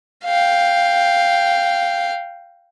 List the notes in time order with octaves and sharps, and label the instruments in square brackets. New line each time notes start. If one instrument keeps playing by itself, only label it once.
[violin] F5 G5